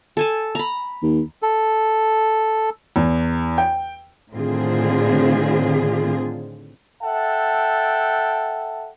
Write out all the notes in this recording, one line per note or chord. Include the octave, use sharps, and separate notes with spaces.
A4 G#5 A5
A#5 B5
D#2
A4
E2
G5
A2 D3 D#3 C4 F4 G#4
A4 E5 F#5 G5 A5